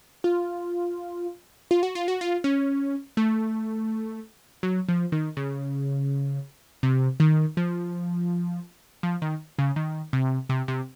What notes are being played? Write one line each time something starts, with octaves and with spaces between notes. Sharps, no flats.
F4
F4
F#4
F4
F#4
F4
C#4
A3
F#3
F3
D#3
C#3
C3
D#3
F3
F3
D#3
C#3
D#3
C3
C3
C3